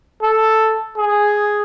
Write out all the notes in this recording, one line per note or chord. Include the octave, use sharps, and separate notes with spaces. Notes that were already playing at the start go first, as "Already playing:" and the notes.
A4
G#4